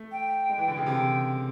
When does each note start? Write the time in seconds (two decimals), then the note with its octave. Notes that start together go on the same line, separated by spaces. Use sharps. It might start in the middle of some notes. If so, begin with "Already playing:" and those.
Already playing: A3
0.11 G5
0.50 G#3
0.58 E3
0.68 D3
0.77 C#3
0.86 C3 G5